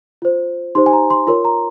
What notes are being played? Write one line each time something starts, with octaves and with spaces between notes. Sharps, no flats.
F4 C5
D#4 G4 C5 C6
G#5
A#5
C6
F4 A#4 C#5 C6
A#5